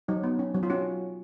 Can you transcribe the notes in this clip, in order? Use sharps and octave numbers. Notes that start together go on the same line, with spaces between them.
F#3 D#4
B3
C#4
F#3
F4
C#4 F#4